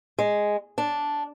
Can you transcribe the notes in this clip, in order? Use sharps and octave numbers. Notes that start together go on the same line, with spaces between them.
G#3
D4